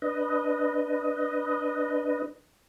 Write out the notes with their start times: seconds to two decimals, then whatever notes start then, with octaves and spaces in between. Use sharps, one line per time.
0.02 D4 B4 D#5